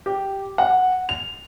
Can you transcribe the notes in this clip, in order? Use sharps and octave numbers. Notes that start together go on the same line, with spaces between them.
G4
F#5
F7